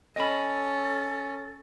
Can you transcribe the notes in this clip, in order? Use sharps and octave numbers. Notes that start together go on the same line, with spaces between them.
C#4 A4 D#5 B5